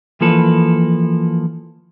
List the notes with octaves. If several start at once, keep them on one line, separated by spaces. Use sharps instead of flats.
E3 F3 A#3 A4 B4